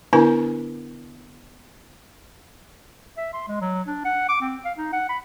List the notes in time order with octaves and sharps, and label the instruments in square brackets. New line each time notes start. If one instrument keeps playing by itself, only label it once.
[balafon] D3 B3 D4 E4 A#4 G#5
[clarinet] E5
C6
G#3
F#3
D4
F#5
D6
C4
F5
D#4
F#5
B5